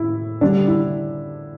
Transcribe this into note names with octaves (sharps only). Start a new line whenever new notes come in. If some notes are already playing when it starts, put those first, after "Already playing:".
Already playing: A2 E4
D3 G3 D4
E4